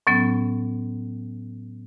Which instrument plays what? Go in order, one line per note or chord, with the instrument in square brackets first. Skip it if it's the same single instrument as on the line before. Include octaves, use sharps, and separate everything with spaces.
[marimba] A2 F#3 B3 C#4